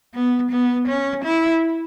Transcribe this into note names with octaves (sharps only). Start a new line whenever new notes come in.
B3
B3
C#4
E4